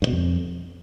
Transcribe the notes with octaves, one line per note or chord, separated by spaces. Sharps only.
G2
B2
F2